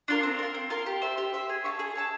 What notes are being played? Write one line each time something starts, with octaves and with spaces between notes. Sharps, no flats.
D4 F4 A#4
C4
F4 A#4
C4
F4 A#4
G4
C5 E5
G4
C5 E5
G#4
C#5 E5 A5
G#4
C#5 E5 A5